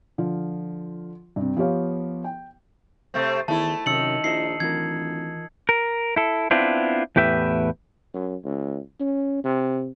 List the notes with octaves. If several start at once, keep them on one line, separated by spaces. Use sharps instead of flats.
D3 F3 F4
G2 C3
F3 B3 G4 C#5 F5
G5
C3 A3 C4
E2 D#3 A3 E4 A5
F#2 C3 D#3 E6 C#7 F#7
A#1 E4 D#5 E5 C7
D1 E3 F4 A#4 G#6
A#4
E4 A4
B3 C4 D4 E4 F4
E2 A2 G4 B4 E5
F#2
C#2
C#4
C3